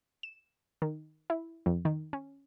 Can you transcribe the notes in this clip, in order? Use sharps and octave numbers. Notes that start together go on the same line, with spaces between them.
E7
D#3
E4
F2
D#3
C#4